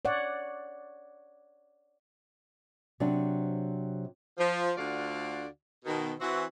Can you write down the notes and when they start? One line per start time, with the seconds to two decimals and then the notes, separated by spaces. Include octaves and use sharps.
0.05 C#5 D5 F#5
3.00 C3 F#3 C4 D4
4.38 F3
4.76 D2 D3 F4 F#4 D5 F5
5.85 B2 D#3
6.20 E3 C4 F#4